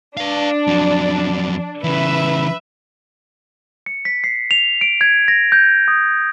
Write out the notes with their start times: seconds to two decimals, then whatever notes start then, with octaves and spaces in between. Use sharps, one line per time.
0.17 D4 B4 F5
0.67 F2 F#3
1.84 C#3 E3 B4 E5
3.86 C#7
4.05 B6
4.24 C7
4.51 F7
4.81 D7
5.01 G#6
5.28 A#6
5.52 G6
5.88 D#6